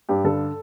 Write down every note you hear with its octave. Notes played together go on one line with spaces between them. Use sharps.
G2 G4
D3 A4